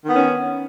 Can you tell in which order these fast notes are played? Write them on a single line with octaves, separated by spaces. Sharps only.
D#3 B3 C#4